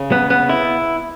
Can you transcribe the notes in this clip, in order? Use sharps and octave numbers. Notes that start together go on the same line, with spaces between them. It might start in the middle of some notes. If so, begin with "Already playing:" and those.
Already playing: C#3
B3
B3
E4